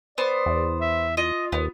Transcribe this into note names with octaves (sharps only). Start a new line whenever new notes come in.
B3 C5 D5
E2
E5
F4 D#5
D#2 B3